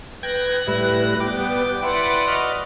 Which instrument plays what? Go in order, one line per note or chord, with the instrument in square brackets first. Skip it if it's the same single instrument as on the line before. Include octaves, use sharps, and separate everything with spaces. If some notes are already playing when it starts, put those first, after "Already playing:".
[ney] B4 [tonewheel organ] G5 G#6 [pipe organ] F#6 A#6
[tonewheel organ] A2 G3 [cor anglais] E4
[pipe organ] G3 B3 [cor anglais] G5 [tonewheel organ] D6
[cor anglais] E4 [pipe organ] B4 D5 F#5 [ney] C6
[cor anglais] F#4 [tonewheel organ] D#5 F6